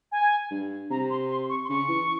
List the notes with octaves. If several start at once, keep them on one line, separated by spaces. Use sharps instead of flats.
G#5
G2
C3 A#5
C6
C6
C#6
C6
C#3 C#6
E3